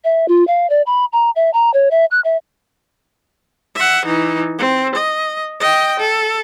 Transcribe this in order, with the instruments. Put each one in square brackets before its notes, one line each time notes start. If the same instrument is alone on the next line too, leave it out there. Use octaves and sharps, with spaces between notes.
[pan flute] E5
F4
F5
D5
B5
A#5
E5
A#5
C#5
E5
F#6
E5
[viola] E5 F#5
E3 D#4
C4
D#5
D#5 G5
A4